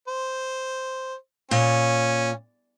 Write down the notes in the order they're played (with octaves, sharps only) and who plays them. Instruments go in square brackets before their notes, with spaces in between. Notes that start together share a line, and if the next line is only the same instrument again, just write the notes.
[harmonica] C5
[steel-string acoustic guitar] A#2 [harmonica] C#4